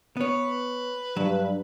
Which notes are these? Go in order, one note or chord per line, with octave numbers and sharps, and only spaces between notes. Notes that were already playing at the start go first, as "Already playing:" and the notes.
B3 B4 C#5
G2 F#3